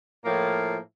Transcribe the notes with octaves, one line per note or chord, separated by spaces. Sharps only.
A2 F3 A#3